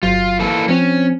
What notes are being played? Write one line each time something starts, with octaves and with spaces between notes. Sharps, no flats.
G1 F#3 F4
E3 A#3 A4
F3 C4 C#4